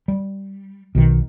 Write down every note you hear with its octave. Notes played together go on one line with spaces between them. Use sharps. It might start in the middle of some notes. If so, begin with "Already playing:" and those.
G3
B1 B2 D#3